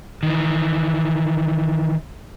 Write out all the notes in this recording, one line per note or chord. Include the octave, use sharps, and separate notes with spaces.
D#3 E3